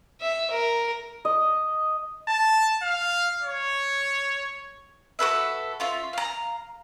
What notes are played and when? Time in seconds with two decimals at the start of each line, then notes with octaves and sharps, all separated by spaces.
0.21 E5
0.50 A#4
1.25 D#5
2.28 A5
2.82 F5
3.43 C#5
5.19 F#4 A4 B4 E5
5.80 C#4 F4 E5
6.13 F5 A#5